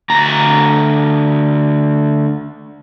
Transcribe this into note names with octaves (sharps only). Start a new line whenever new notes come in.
D2 A#5